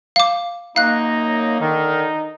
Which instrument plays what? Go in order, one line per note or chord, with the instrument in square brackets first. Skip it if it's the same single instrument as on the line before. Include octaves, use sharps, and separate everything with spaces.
[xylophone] F5 D6
[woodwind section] F#2 A#3 [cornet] D#4 [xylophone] F5 F#6
[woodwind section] D3 D#3 [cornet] D#4